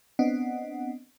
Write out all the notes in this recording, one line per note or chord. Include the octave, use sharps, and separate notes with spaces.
B3 C4 D4 D#5 F#5